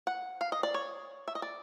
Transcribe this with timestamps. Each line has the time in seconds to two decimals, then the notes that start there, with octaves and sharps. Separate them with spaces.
0.07 F#5
0.41 F5
0.52 D#5
0.63 D5
0.74 C#5
1.28 E5
1.35 D#5
1.42 D5